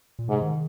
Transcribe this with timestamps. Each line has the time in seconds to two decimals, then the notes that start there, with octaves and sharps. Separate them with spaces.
0.19 A#2
0.29 G#2 C3
0.42 D#3